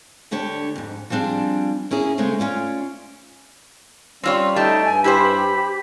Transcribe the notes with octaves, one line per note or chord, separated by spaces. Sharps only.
D2 D3 D4 G4 C#5
F2 G#2
F3 G3 C4 D4 F4 G#4
A#3 C#4 E4 G#4
C#3 G#3 A3 C4 C#4
C#4 F4 C#5 D5
G3 C4 C#4 F4 C#5
A3 D#4 G4 A5
G2 G#5
E4 G4 B4 C5 B5